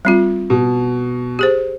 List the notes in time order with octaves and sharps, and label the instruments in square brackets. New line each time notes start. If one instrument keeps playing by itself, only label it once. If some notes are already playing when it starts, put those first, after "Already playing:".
[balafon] G3 C4 F4
[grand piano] B2
[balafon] G4 G#4 C5